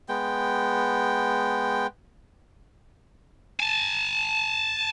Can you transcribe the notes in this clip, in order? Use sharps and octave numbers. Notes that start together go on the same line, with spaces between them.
G#3 B3 G5
G#5 A5